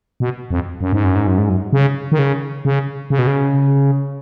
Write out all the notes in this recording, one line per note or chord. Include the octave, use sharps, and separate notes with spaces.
B2
F2
F#2
G#2
F#2
G#2
F#2
G#2
F#2
C#3
D#3
C#3
C#3
C#3
B2
C#3